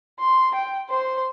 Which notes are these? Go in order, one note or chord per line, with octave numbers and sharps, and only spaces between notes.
C6
G5
C5 C6